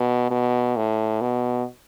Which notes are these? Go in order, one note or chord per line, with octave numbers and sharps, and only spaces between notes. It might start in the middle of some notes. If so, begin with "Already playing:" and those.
Already playing: B2
B2
A2
B2